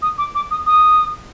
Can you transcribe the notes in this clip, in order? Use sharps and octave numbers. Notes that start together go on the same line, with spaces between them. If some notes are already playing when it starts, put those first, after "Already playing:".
D#6
D6
D6
D#6
D#6